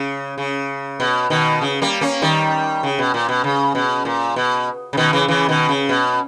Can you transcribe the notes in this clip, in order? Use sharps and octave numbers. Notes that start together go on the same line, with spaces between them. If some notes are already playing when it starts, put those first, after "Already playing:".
Already playing: C#3
C#3
B2
B2 D#3
C#3
G3 A#3
A#3 C#4
D#3 G3
C#3
B2
A#2
B2
C#3
B2
A#2
B2
C#3
B2 D#3
C#3 E3
C#3 E3
B2 D#3
C#3
B2